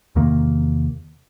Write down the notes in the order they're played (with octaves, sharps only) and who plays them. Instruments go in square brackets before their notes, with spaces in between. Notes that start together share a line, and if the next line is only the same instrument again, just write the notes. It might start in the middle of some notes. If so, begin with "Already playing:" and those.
[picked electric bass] E2 C3 D#3 A#3